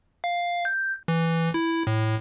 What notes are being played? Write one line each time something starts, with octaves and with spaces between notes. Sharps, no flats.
F5
G6
E3
E4
A2